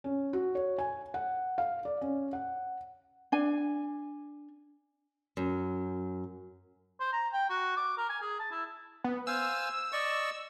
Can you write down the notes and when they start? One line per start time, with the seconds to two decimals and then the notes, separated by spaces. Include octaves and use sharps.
0.04 C#4
0.33 F#4
0.55 C#5
0.78 G#5
1.14 F#5
1.58 F5
1.85 D5
2.01 C#4
2.33 F#5
3.32 D4 G#5
5.37 F#2
7.00 C5
7.12 A#5
7.33 G5
7.49 F#4
7.76 D6
7.97 A#4
8.09 G#5
8.21 G#4
8.39 A5
8.51 E4
9.04 B3
9.27 C5 F5 G#5 E6
9.92 D5 D#5 C#6